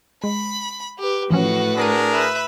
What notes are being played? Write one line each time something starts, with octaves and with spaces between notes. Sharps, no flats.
G#3 B5
G4 B4
A2 E3 F3 C#4 F#4 B4
D4 G#4 A#4 A#6 C7 D#7
B4 E5 B5